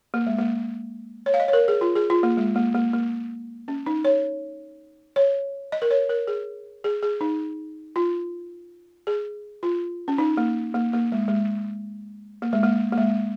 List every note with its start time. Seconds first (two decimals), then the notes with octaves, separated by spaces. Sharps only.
0.14 A#3
0.27 G#3
0.38 A#3
1.26 C#5
1.34 F5
1.40 D#5
1.48 C#5
1.53 A#4
1.68 G#4
1.81 F4
1.96 G#4
2.10 F4
2.23 A#3
2.37 G#3
2.56 A#3
2.75 A#3
2.94 A#3
3.68 C#4
3.86 D#4
4.05 C#5
5.16 C#5
5.72 D#5
5.82 A#4
5.90 C#5
6.09 A#4
6.27 G#4
6.84 G#4
7.03 G#4
7.21 D#4
7.96 F4
9.07 G#4
9.63 F4
10.08 C#4
10.18 D#4
10.37 A#3
10.74 A#3
10.93 A#3
11.12 G#3
11.28 G#3
12.42 A#3
12.53 G#3
12.63 A#3
12.92 A#3
12.98 G#3